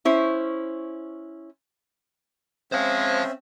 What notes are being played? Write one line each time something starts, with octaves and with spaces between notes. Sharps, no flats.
C#4 E4 C5
G#3 C4 C#4 C5 E5 F5